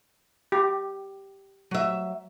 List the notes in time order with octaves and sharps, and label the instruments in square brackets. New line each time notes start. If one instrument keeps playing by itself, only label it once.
[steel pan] G4
[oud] F#3 E5